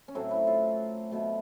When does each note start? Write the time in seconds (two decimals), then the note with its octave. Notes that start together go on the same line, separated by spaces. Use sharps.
0.08 C#4
0.15 A2 F#3 A3 C4
0.31 E4
0.47 F4
1.11 B2 F#3 A3